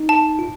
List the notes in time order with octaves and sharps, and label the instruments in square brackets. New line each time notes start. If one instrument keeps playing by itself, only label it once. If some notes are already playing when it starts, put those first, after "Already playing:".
Already playing: [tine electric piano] D#4
[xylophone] A5
[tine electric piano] F4